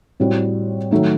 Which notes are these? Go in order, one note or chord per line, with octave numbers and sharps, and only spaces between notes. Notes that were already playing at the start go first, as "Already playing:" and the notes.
A2 G3 C4 F#4
D#3 F#3 A3